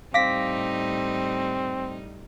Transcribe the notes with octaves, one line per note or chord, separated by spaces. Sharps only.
A2 G3 C4 D#4 F5 D6 A#6 B6